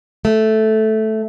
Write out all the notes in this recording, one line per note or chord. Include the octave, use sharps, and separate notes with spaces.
A3